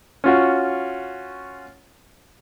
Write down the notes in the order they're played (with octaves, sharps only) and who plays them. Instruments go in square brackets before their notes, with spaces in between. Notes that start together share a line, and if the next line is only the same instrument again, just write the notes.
[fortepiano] C#4 F4 F#4